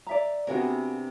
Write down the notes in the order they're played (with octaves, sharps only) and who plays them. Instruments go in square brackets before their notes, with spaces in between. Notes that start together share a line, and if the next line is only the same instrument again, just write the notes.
[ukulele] D5 E5 A#5
[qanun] C3 B3 D4 [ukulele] F#4 G#4 A#4